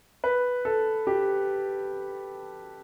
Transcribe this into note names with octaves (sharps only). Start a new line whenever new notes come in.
B4
A4
G4